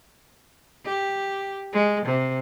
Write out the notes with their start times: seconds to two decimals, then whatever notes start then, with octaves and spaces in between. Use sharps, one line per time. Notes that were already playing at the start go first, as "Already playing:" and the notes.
0.85 G4
1.73 G#3
2.05 C3